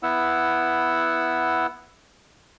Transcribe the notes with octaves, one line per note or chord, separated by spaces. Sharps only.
B3 E4 F#5 E6